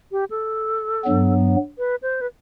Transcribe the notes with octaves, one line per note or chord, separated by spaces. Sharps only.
G4
A4
G2 F#3 B3
B4
C5
B4